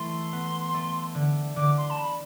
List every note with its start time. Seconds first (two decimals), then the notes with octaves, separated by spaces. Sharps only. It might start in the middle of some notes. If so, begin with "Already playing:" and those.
Already playing: E3 A3 C6
0.33 B3
0.74 A3
1.15 D3
1.56 D3 D6
1.77 C6
1.90 A5
1.99 B5